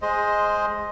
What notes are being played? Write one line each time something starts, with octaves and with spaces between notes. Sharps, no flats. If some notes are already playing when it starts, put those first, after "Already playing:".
G#3 C5 D#5